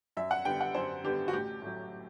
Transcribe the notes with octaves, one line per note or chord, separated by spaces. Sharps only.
F#2 E5
F#5
D3 G3 B3 G5
F#5
F#2 C5
D3 G3 B3 G4
F#4
A1 G4
A2 F#3